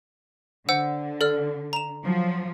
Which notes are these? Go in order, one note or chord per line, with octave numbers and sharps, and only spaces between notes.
D3 C5 F#5 E6
A4 D5 F6
A#5 E7
F3 F#3